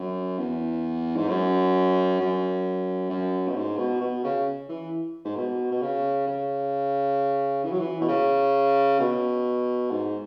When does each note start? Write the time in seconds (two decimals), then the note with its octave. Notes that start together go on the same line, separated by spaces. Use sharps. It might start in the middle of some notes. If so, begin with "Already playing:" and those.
Already playing: F#2
0.38 E2
1.16 G#2
1.28 F#2
2.20 F#2
3.10 F#2
3.48 B2
3.56 G#2
3.77 B2
4.01 B2
4.24 C#3
4.69 E3
5.25 G#2
5.37 B2
5.71 B2
5.82 C#3
6.27 C#3
7.64 E3
7.71 F#3
7.80 E3
8.01 B2
8.08 C#3
9.00 B2
9.91 G#2